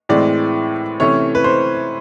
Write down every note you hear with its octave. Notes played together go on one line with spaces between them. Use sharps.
A2 E3 G#3 C4 D5
C3 E3 A3 C#4 C#5
B4
C5